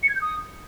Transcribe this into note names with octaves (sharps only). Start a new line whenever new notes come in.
C#7
G#6
G6
D#6